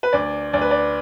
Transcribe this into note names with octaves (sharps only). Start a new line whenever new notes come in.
B4
D2 D5
D2 D5
B4
D5